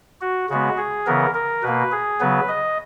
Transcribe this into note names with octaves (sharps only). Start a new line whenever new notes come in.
F#4
C#3 G#3 B3 F#4
G#4
C#3 E3 B3 A#4
A#4
B2 A#3 B4
G#4
C#3 F#3 B3 B4
D#5